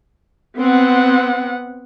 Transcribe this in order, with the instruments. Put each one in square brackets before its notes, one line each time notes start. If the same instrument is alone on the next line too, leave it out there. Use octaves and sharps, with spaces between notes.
[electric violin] B3 F#5 [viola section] C4